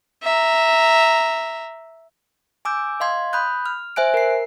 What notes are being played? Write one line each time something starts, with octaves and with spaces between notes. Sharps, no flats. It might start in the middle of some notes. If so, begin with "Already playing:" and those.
E5 A#5
G#5 D6 E6 G6
D#5 F5 C6 G#6
B5 D#6 F#6 G6
F6
C5 E5 G#5 F#6 D7
A#4 C7